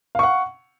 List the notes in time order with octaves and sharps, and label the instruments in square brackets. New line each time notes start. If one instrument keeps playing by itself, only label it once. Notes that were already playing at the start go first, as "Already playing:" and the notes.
[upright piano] F5
C#6
F#5